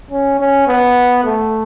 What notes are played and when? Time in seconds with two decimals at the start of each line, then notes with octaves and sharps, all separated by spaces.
0.11 C#4
0.40 C#4
0.68 B3
1.24 A3